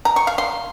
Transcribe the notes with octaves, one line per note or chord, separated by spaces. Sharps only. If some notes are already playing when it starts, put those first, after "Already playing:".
A#5
C#6
F5
C6